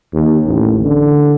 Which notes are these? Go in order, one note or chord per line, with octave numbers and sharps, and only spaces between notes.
D#2
A1
D3